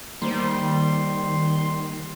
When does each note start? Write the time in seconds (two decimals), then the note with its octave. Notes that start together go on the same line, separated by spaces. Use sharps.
0.22 D#3 G3 A#3 C5 C6